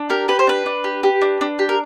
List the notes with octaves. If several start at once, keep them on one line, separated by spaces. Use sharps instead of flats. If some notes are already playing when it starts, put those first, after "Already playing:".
Already playing: D4
G4 A#4
G4 B4
C5
D4 B4
D4
G4
G4
D4
D4
G4
A#4